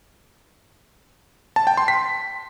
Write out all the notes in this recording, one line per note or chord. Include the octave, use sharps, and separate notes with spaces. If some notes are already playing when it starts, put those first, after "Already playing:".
A5
G5
C6
B6